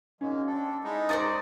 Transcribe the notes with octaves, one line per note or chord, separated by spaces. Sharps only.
F#3 G#3 A#3 C#4
C4 D4 A4
G#3 D#4 E4 A4
C5 D5 A#5 C#6 D#6 A6